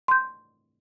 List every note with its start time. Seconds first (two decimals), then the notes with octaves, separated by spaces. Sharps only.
0.08 C6 G6